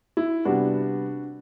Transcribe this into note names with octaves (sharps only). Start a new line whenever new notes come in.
E4
C3 G3 B3 D4 F#4